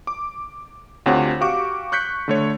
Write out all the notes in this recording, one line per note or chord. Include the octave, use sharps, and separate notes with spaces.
D6
D2 C4 F4 G4 C#5 F#5
F#4 G4 F5 C#6 D6
C#6 F#6 G6 B6 C#7
D3 A3 C#5